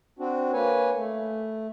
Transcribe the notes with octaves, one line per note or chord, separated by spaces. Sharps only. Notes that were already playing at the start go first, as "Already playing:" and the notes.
C4 D4 F#4
A#3 B4 C#5 G#5
A3